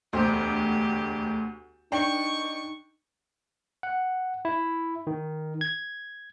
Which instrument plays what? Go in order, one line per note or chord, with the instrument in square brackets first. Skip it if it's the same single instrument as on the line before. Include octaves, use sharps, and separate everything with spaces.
[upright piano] E1 C5 [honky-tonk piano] D2 [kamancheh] G4
[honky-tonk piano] D4 [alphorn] D#4 [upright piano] G5 [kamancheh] C#6
[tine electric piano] F#5
E4
D#3
G#6